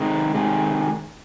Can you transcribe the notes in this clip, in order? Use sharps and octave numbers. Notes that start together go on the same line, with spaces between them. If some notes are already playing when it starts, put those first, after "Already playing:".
Already playing: C3 D#3 G#3
C3 D#3 G#3